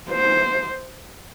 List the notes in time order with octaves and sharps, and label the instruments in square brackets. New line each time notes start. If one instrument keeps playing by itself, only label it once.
[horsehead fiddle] C5